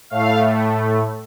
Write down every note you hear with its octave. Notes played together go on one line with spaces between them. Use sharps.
A2 A3 F5